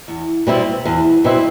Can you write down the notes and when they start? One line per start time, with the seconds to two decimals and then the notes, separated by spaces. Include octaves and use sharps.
0.08 E2
0.47 B2 G3 C4 E4
0.85 E2
1.24 B2 G3 C4 E4